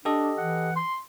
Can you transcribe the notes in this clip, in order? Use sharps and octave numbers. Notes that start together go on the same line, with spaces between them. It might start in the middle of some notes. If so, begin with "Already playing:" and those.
D4 G4 A4 D#5
E3 F#5
C6